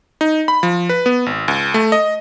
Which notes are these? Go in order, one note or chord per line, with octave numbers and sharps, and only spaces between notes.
D#4
B5
F3
B4
B3
G#1
C#2
A3
D#5